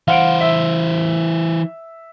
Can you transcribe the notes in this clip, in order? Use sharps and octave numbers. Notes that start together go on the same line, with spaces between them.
E3 C5 F5 F#5 D7
E5